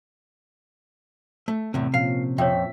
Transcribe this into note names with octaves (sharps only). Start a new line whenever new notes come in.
A3
E2 A2 C3
A#2 F3 C#4 F5
F2 C#5 E5 G5